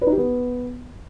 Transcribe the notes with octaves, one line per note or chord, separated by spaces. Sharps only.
B4
D#4
G4
B3